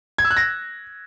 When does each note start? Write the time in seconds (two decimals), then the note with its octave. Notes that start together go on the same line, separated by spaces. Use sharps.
0.18 G#6
0.25 E6
0.31 F#6
0.37 A#6